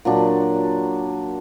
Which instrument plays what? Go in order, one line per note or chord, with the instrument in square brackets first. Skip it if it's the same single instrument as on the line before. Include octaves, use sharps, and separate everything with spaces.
[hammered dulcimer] A#2 F#3 D4